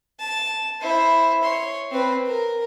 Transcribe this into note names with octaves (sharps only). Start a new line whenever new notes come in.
A5
E4 C5
C#5 C6
C4 B4
A#4